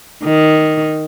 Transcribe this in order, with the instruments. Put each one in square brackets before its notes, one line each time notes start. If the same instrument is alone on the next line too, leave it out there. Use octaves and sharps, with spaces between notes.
[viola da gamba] D#3